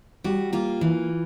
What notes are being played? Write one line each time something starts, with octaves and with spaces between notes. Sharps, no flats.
G3 F#4
A#3 F4
E3